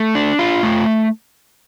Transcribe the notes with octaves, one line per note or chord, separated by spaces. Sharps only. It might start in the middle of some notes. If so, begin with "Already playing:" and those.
Already playing: A3 A5
D4
F4
A3